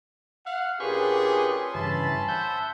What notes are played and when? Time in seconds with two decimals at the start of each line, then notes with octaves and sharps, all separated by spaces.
0.46 F5 F#5
0.80 A#2 C#4 D4 G4 G#4 B4 C6 C#6
1.75 G2 C#3 E3 A5 B5
2.28 C5 E5 F#5 G6